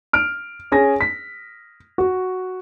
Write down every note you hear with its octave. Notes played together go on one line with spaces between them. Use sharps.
F6 D7
C#4 G#4 G#5 A#6
B6
F#4